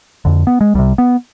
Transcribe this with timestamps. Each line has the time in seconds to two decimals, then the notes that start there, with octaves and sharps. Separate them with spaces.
0.25 F2 D3
0.47 B3
0.61 G#3
0.75 C2 C3 G3
0.98 B3